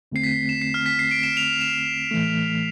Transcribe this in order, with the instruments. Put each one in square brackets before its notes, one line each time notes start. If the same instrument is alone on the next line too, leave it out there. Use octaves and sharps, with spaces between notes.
[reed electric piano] E2 D3 A3 C4 [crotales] C7
[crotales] B6
E7
C7
F6
B6
C7
D7
E7
F7
E7
[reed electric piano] A2 E3 A3